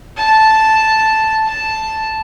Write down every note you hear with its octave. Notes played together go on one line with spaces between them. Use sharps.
A5
A5